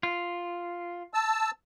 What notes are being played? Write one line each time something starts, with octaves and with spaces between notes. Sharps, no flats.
F4
A5 E6